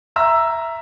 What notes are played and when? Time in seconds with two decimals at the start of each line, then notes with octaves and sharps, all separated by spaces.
0.16 E5 A#5 E6